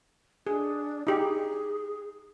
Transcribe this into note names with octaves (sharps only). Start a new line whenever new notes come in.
D4 G#4
D#4 G4 G#4